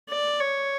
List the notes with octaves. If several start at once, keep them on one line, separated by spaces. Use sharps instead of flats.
D5
C#5